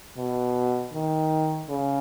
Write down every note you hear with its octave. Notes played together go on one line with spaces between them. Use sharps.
B2
D#3
C#3